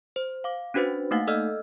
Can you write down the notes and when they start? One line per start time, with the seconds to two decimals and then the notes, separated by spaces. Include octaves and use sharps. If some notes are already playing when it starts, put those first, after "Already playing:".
0.16 C5
0.44 F5 D6
0.74 C#4 D4 F#4 B4 C5 A6
1.11 A3 A#3 D#4 F5 F#5 A6
1.27 A4 D5 D#5 E6 F6